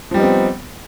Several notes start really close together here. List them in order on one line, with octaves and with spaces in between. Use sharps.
F3 G3 D#4 B3 C4